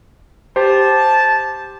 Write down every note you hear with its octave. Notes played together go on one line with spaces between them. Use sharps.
G4 C5 A5